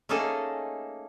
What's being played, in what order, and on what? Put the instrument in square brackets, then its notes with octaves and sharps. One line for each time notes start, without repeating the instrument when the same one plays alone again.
[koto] A3 A#3 C#4 D#4 G#4 A4